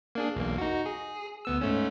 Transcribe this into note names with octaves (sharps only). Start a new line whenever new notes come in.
A#3 D4 G#4
B1 E2 A#3
D#4 F#4
G#4
D2 B3 E6
G#2 A3 C#4